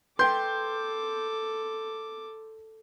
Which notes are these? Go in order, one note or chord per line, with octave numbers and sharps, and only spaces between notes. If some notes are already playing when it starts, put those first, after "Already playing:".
A4 B4 G5 C6 D6 G6